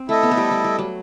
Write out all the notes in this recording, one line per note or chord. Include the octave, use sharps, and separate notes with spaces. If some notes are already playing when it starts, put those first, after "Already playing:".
Already playing: C4
A3 E4 A4 D#5
B3
A3
G3
G3
G3
F#3